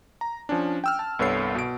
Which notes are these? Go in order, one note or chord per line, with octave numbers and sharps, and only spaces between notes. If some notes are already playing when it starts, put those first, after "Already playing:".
A#5
F3 C#4 D4
G5 E6 F6
A5
C2 G2 B3 A4 C#5 C7
B2 D7